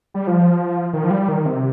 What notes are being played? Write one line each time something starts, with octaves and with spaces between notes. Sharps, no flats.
G3
F3
D#3
F3
G3
D#3
C3